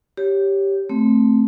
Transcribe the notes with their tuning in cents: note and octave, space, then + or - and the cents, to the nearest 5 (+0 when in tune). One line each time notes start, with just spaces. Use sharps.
G4 +0 C#5 +0
A3 +0 C4 +0